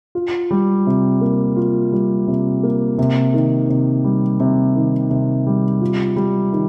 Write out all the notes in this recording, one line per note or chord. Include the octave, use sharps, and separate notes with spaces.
F4
G3
C3
A#3
F4
G3
C3
A#3
C3
D#3
C3
G3
C3
D#3
C3
G3
F4
G3
D#3